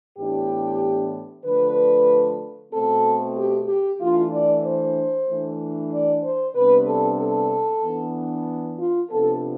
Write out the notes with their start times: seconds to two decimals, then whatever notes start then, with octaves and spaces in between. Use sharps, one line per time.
0.17 A2 E3 B3 D4 G4
1.45 D3 F3 A3 D4 B4
2.72 B2 A3 C4 A4
3.37 G4
3.68 G4
4.00 E3 A3 D4 F4
4.32 D5
4.64 C5
5.27 E3 A3 D4
5.91 D5
6.23 C5
6.55 C3 G3 B3 D4 B4
6.87 A4
7.19 A4
7.83 E3 B3 D4
8.78 F4
9.10 C3 F3 B3 D4 A4